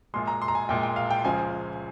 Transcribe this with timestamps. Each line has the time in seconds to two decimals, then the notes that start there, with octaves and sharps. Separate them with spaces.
0.14 A#1 A#2 G#3 C6
0.27 A#5
0.42 C6
0.48 A#5
0.55 G#5
0.68 A#1 A#2 G#3 G5
0.83 G5
0.96 F5
1.11 G5
1.24 C#2 C#3 F3 G#3 G#5